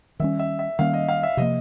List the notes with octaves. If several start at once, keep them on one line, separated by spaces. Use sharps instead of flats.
D#3 G3 A#3 C#4 E5
E5
E5
D#3 G3 A#3 C#4 F5
D#5
F5
E5
C3 F3 A#3 D#5